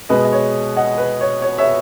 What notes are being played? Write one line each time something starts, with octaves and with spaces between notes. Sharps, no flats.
B2 G#3 B3 B4 D#5
D#5
C#5
D#5 F#5
B4
C#5
C#5
C#5 E5